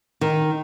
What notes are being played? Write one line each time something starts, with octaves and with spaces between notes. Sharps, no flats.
D#3